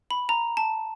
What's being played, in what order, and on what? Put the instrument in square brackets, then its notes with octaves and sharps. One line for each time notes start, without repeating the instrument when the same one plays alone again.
[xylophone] B5
A#5
A5